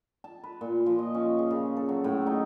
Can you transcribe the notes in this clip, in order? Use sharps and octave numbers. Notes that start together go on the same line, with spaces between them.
A5
B4
A#2
F3
D#5
C#4
G#4
C#3
A4
F#3
A2
D#4